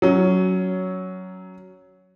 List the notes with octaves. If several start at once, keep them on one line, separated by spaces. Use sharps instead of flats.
F#3 C#4